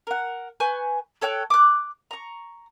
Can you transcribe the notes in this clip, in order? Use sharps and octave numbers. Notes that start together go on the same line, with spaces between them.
A#4 F#5
B4 G#5 C#6 G6
A4 C#5 G5 F#6
D6 F#6
A#5 C#6